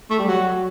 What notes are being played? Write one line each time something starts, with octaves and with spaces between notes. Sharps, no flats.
A3
G3
F#3